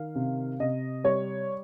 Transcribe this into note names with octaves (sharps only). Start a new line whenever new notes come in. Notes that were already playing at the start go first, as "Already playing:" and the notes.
Already playing: D#3 F5
C3
C3 D#5
G3 C#5